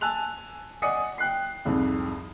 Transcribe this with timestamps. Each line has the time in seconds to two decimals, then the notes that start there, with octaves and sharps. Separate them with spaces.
0.01 G#5 A5 E6 F#6 F7
0.82 D5 D#5 F#5 G#5 D#6 C#7
1.18 G5 F#6 C7
1.65 C2 F2 G#2